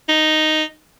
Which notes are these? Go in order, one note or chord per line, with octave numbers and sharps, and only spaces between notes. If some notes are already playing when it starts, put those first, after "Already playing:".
D#4